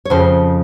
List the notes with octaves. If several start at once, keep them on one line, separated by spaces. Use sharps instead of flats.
C#5
F2 C#3 F3 C5